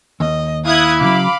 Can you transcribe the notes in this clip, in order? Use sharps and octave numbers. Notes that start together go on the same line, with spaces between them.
D#2 D#5
E4 F5 D#6 F#6 G#6
C#3 E3 F#3 F5 B5 D6